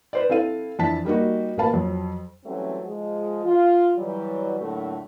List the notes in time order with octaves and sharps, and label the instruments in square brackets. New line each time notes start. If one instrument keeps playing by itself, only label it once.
[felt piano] B4 C5 D5
C4 E4 A4 F5 D#7
F2 E3 D4 A5 B6
G3 A#3 D#4 F#4
A1 A#3 A#4 F5 A5 B5
F2 F#3
[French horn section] E3 F#3 G3 A3 C4 C#4
F3 G#3
F4
E3 F#3 G3
F2 A2 D3 F#3 A3 A#3